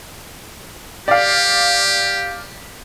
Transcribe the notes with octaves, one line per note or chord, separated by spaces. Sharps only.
G4 D5 F5